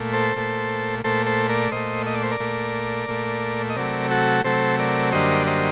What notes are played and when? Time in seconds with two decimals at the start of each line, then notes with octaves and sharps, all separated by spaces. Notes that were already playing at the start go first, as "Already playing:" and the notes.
Already playing: A#2 A3
0.13 A4 C5
0.36 A#2 A3
1.04 A#2 A3 A4 C5
1.26 A4 C5
1.49 A#4 D5
1.72 A#2 A3 C5 D#5
2.07 D#5
2.14 D5
2.23 C5
2.31 A#4 D5
2.40 A#2 A3
3.08 A#2 A3
3.70 D#5
3.76 C3 F#3 A3 A#4 D5
4.11 F#4 A4
4.44 C3 F#3 A3 A4 C5
4.79 A#4 D5
5.12 F#2 D3 G3 A#3 C5 D#5
5.47 C5 D#5